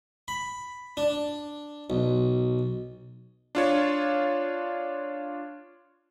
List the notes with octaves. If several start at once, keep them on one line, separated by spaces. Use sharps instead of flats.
B5
D4
B1
D4 F4 C#5